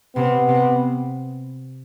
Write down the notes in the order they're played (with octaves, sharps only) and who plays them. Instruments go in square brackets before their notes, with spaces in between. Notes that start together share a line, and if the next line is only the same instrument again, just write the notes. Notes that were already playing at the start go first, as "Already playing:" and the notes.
[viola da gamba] C3 [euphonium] B3
[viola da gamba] C3